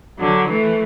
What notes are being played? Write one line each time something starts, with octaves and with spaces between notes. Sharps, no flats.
D3 F#3
E3 A3